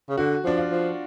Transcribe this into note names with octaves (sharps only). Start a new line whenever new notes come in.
C#3
D3 F#4
F3 D4
F4
F3